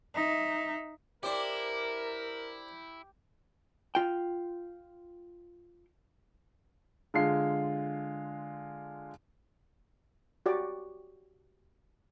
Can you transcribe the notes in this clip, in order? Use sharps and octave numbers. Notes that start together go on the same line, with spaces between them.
D#4 E5
D4 E4 G4 A#4 C5 D5 D6
F4 G5
D3 G#3 F4 C7
F#4 G4 D5